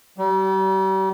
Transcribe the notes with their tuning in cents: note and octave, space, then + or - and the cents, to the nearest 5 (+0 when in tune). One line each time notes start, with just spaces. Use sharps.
G3 -40